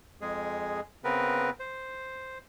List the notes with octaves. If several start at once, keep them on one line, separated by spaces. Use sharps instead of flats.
F2 G#3 G#4
C#3 B3 C4 A#4 B4
C5